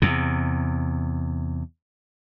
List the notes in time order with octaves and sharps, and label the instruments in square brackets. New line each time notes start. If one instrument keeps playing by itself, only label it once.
[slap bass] E2 C3